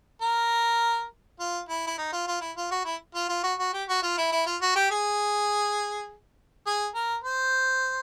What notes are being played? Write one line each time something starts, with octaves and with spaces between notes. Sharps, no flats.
A#4
F4
E4
E4
D#4
F4
F4
E4
F4
F#4
E4
F4
F4
F#4
F#4
G4
F#4
F4
E4
E4
F4
F#4
G4
G#4
G#4
A#4
C5